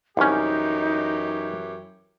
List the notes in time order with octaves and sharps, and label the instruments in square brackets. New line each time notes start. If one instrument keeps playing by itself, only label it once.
[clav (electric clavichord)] C2 C#4 [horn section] F#2 E3 G4 [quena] D#4